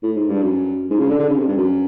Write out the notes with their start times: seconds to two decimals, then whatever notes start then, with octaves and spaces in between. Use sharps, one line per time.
0.03 A2
0.16 G#2
0.29 G2
0.42 F#2
0.90 G#2
1.00 C#3
1.09 D3
1.19 D3
1.29 C#3
1.38 C3
1.48 G2
1.57 F#2